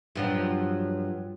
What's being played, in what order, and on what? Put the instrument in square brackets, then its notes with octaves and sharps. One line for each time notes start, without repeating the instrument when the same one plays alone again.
[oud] G2 F3 F#3